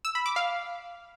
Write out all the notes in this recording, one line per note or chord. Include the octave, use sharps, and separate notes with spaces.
E6
B5
D6
F5